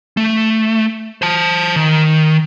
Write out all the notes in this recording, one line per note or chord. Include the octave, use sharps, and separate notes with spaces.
A3
C5 A5
D#3